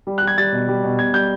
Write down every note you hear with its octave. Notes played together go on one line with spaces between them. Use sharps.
G3
G3 F#6
G#6
G3 A6
B2
G3
B2
B2 G#6
G3 G6